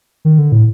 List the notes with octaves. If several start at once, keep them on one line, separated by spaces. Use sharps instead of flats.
D#3
D3
A2